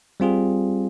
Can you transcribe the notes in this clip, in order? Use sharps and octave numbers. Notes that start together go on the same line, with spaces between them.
G3 C4 F4 G#4